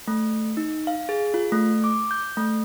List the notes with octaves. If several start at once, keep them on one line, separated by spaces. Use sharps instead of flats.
A3
D#4
F5
G#4
F4
A3
D6
G6
A3